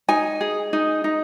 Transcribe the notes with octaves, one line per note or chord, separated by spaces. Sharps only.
D#4 G#5
G#4
D#4
D#4